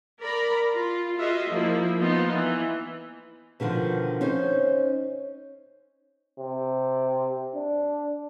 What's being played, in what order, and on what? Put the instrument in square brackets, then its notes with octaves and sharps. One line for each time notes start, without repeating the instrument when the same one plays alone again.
[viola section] A#4 D5 A#5 B5
F4
F4 F#4 G#4 D#5 E5
F3 A#3 E4
F3 A#3 B3 D#4 F4
E3
[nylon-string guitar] B2 D3 D#3 F3
C#4 D#4 C5
[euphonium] C3
D4